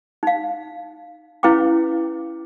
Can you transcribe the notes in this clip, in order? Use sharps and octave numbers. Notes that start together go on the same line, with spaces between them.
D#4 F5
C#4 E4 B4 F5 G5 D6